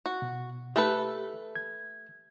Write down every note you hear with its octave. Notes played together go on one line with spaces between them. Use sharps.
F#4
B2
A3 G4 A4 B4
G#6